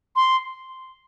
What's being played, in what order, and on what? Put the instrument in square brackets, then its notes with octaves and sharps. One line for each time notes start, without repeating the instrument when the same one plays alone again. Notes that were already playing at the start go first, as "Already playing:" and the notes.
[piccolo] C6